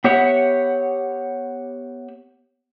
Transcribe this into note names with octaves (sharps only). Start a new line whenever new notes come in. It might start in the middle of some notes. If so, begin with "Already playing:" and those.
B3 G4 C#5 E5 F#5